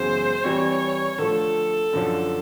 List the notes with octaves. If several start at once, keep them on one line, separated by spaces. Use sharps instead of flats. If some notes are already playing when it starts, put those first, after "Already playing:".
Already playing: F#2 C#3 E3 G#3 B3 C5
E3 G3 C4 C#5
D3 F3 A3 A4
F#2 D3 F3